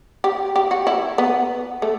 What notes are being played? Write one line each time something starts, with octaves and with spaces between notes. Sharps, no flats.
G4
G4
F#4
E4
B3
A3